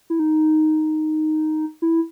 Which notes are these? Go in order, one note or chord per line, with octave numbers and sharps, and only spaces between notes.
E4
D#4
E4